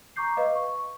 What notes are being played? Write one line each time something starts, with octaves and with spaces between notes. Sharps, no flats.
A#5 C#6 D6 G6 C7
B4 D#5 F5
C#6